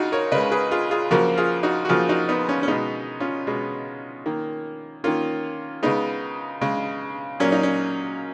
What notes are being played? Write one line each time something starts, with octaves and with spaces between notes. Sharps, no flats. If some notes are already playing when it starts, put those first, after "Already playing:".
Already playing: C#3 D#4 F4 F#4 G#4
A#4 C#5
C#3 G#3 B4 D#5
G#4 B4
F4 G#4
F4 G#4
C#3 F3 A#3 F#4 A#4
F4 G#4
D#4 F#4
F#4
C#3 F3 A#3 F4 G#4
D#4 F#4
B3 D#4
C#4
C#4
B2 G#3 B3 D#4
C#4 F4
B2 G#3
D#3 A#3
D#3 A#3 C#4 F4
C#3 G#3 B3 D#4
C#3 G#3
A#2 F#3 A#3 C#4
D#4
C#4